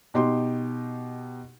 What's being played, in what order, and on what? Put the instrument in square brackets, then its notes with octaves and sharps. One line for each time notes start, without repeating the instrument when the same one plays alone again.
[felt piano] B2 D#4 G4 C6